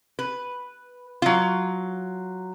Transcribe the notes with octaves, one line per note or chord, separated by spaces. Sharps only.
B4
F#3 F4